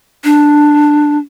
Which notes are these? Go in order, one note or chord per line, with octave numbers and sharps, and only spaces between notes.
D4